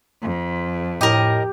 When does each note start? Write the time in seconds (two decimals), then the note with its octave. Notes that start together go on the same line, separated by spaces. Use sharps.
0.22 F2
1.01 A2 G4 A#4 D#5